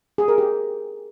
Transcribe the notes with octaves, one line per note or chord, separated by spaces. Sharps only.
G#4
A#4
G4